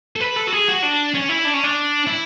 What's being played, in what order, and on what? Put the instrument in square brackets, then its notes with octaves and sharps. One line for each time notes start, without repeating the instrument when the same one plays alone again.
[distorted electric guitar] A4
B4
A4
F#4
G#4
F#4
D4
C#4
E4
D4
C#4
D4
E4